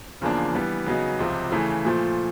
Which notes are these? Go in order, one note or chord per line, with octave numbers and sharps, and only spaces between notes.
E2 C#3 F3 A#3 D4
E3 G3 B3
C#3 F#3 B3 D#4
C#2 C3 F3
C#3 E3 A3
A#2 F3 A3